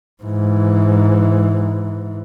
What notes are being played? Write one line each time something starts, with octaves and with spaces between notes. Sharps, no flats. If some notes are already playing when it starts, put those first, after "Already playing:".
G#2 E3